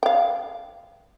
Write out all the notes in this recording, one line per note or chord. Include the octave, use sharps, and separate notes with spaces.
F5 G5